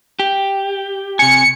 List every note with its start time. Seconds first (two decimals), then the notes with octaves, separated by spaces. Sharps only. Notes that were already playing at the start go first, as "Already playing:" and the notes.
0.19 G4
1.19 C3 G#5 C#7